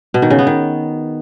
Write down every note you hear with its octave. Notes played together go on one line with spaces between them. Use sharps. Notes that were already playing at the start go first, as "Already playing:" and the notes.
B2
D#3
C#3
B3
D#3